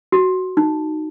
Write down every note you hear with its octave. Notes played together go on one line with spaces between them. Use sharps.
F#4
D#4